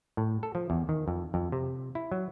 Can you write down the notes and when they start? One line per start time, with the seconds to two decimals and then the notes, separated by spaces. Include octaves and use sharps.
0.17 A2
0.43 A4
0.55 F3
0.70 E2
0.89 D#3
1.08 F2
1.34 F2
1.52 C3
1.95 E4
2.12 F#3